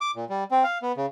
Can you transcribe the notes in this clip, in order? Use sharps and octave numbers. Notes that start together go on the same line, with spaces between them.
D6
A#2
G3
C4
F5
B3
C#3